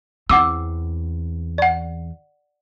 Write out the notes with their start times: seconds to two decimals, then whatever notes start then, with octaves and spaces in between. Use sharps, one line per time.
0.30 E2 C4 F#5 D6 E6
1.58 D5 F#5